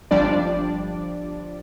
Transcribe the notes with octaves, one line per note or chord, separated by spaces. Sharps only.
G1 F3 G3 D4 D5